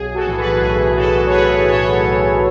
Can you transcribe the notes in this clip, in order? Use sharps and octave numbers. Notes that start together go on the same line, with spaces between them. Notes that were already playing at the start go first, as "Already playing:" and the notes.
Already playing: B1 G#4
F#4 A4
A2 E3
G#4 B4
B1 G#4
A2 E3 F#4 A4
C#5
B1 G#4 B4
A2 E3 A4 C#5
B1